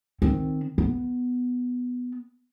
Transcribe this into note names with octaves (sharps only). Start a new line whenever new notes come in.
D#3 C4
B3